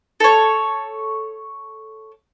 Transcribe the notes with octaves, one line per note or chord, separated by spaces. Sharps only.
A4 C#5